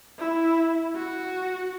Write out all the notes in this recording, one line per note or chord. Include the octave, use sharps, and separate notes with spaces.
E4
F#4